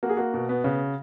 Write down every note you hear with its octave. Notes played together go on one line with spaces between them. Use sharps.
A#3 F#4
G#4
A#3 F#4
B2
B3
C#3